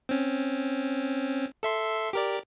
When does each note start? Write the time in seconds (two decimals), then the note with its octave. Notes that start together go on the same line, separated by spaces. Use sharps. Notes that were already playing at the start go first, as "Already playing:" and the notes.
0.09 C4 C#4
1.63 A4 E5 C6
2.13 G4 A#4 D5